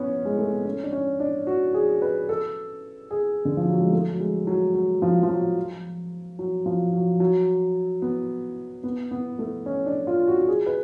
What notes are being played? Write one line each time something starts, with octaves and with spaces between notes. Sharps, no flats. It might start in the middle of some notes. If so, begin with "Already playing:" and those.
Already playing: B3 C#4
G#3
A3
B3
C#4
D4
C#4
D4
F#4
G#4
B4
A4
G#4
D3
F3
F#3
G#3
A3
F#3
G#3
F#3
F#3
F3
F3
F#3
F#3
F3
F#3
F#3
B3
B3
B3
A3
C#4
D4
F4
F#4
F#4
G#4
B4